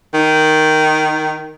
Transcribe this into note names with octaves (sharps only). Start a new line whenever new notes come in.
D#3